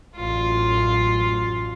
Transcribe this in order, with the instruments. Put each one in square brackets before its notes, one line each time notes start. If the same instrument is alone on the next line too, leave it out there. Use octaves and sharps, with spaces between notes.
[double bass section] A1 F#2 [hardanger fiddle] F4